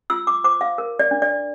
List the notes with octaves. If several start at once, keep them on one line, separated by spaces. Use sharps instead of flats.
F4 E6
D6
C5 D6
F5
A#4
D5
D4
D5